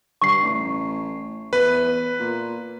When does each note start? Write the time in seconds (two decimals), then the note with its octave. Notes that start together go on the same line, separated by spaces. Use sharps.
0.22 G2 C#6 C7
0.43 A1
1.53 E2 B4
2.19 A#2